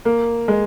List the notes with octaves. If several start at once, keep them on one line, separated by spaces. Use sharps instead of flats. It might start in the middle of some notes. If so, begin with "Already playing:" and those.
A#3
G#3